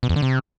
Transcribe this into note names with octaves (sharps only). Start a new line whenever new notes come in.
B2
E2
D3
C3